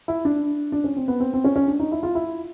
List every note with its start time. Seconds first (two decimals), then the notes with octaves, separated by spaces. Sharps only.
0.08 E4
0.25 D4
0.72 D4
0.84 C#4
0.96 C4
1.08 B3
1.20 C4
1.34 C4
1.44 C#4
1.56 C#4
1.68 D4
1.80 D#4
1.92 E4
2.03 F4
2.15 E4